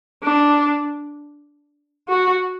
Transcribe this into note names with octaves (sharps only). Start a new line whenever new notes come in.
D4
F#4